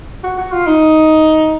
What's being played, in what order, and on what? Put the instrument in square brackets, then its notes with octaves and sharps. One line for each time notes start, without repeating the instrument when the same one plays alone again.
[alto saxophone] F#4
F#4
F4
D#4